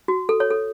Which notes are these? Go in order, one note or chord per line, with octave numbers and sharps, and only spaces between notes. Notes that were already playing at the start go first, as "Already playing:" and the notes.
F#4
A4
A4 C#5
A4